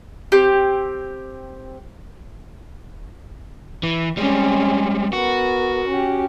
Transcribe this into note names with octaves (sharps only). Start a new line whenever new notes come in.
C4 G4
E3
G3 G#3 C4 C#4
B3 F#4 A#4
C#4 G4